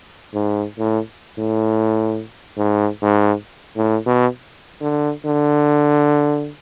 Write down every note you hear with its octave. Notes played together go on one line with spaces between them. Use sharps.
G#2
A2
A2
G#2
G#2
A2
B2
D3
D3